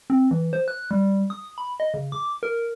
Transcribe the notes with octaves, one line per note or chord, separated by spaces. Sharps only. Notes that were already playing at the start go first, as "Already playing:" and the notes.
C4
E3
C5
F#6
G3
D#6
B5
D#5
C#3
D6
A#4